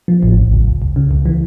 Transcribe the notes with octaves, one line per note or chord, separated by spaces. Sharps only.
F3
A1
A1
C#2
C#2
C#2
C#3
C#2
E3